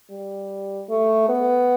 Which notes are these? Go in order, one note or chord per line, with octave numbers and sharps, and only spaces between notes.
G3
A3
B3